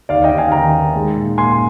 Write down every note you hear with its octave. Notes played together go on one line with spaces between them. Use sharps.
D#2 D5 F5
D#5 G5
D#2
F5 G#5
D#3 G5 A#5
D#3
G#3
A#2
A#2 G#5 C6